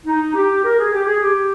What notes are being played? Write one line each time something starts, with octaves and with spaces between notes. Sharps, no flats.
D#4
G4
A#4
G#4
G4
G#4
G4